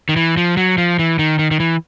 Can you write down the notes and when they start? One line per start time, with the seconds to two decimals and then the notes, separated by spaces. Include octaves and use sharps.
0.09 D#3
0.16 E3
0.37 F3
0.57 F#3
0.78 F3
0.99 E3
1.19 D#3
1.39 D#3
1.51 D#3
1.60 E3